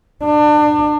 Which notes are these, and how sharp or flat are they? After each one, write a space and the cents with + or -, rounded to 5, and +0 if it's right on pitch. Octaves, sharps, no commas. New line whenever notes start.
D4 +30